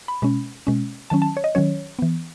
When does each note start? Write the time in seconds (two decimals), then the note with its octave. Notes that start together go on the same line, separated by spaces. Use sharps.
0.08 B5
0.22 B2 G#3 C#4
0.67 B2 G#3 C#4
1.10 D#3 F#3 C#4 A5
1.22 A5
1.37 C#5
1.44 D#5
1.55 D#3 F#3 C#4 C#5
1.99 E3 B3